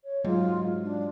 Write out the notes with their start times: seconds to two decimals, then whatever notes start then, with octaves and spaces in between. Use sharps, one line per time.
0.04 C#5
0.25 G#2 F#3 F4
0.83 D4